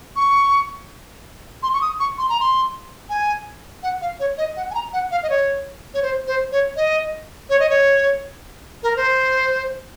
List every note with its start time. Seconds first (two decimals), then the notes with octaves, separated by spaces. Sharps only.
0.16 C#6
1.63 C6
1.74 C#6
1.81 D#6
2.00 C#6
2.18 C6
2.29 A#5
2.40 C6
3.10 G#5
3.83 F#5
4.01 F5
4.20 C#5
4.38 D#5
4.57 F#5
4.71 G#5
4.74 A#5
4.93 F#5
5.11 F5
5.23 D#5
5.30 C#5
5.94 C#5
6.02 C5
6.27 C5
6.52 C#5
6.76 D#5
7.49 C#5
7.60 D#5
7.69 C#5
8.83 A#4
8.97 C5